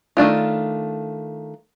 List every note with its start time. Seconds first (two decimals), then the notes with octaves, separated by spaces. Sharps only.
0.17 D#3 A3 D4 F4